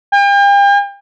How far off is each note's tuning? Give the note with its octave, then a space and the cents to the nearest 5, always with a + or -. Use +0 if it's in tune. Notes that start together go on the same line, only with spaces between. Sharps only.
G5 +40